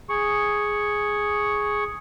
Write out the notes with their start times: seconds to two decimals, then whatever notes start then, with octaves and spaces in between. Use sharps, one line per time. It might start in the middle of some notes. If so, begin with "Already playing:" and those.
0.09 G#4 C#6